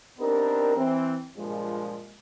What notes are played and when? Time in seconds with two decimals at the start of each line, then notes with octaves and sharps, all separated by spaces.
0.19 B3 C4 D4 D#4 G4 A#4
0.76 E3 C4
1.37 G2 A#2 F3 G#3